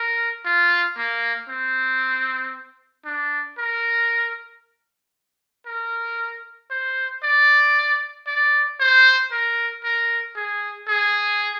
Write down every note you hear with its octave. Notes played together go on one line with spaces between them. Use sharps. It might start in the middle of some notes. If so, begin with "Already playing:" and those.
Already playing: A#4
F4
A#3
C4
D4
A#4
A#4
C5
D5
D5
C5
A#4
A#4
G#4
G#4